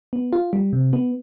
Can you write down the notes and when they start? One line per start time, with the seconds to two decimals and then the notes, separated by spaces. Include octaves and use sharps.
0.13 B3
0.33 F4
0.53 G3
0.73 C3
0.93 B3